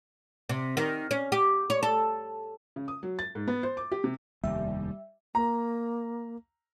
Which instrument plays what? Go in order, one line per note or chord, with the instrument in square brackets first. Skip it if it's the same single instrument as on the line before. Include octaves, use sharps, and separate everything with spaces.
[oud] C3
D#3
C#4
G4
C#5
A4
[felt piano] C#3
D#6
F#3
A6
G#2
B3
C5
D6
G4
C3
[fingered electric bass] F1 D#2 [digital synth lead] G3 [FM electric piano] E5
[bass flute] A#3 [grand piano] A#5